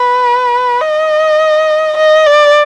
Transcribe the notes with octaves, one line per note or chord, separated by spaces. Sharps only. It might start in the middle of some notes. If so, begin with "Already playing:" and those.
Already playing: B4
D#5
D#5
D5